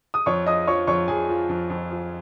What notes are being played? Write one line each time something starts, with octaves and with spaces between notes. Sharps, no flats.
D#6
F2 C#5 C#6
F3 D#5 D#6
F3 C#5 C#6
F2 C#5 C#6
F2 G#4 G#5
F3
F2
F2
F3